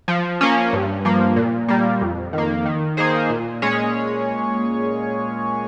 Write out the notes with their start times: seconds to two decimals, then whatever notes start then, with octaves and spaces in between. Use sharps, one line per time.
0.08 F3
0.41 A#3 C#4
0.73 G2
1.05 F3 A#3
1.36 A#2
1.68 G3 A#3
2.01 F2
2.33 D#3 A#3
2.66 D#3
2.97 A#3 D#4 G#4 C5
3.30 A#2
3.62 G#3 C#4 G#4 C#5